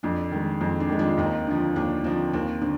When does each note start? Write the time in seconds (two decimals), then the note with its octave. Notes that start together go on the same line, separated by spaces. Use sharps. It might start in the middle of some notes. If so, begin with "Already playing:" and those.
0.03 F2 D4
0.32 D#3 G#3
0.61 F2 C4
0.80 D4
0.89 D#3 G#3
0.99 D4 F4
1.18 D#2 C4 D#4
1.47 D3 F3
1.76 D#2 D4
2.04 D3 F3 C4
2.33 D#2 C4
2.62 D3 C4